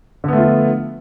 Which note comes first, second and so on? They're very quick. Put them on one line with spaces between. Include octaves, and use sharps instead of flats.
D3 B3 A3 F4 F3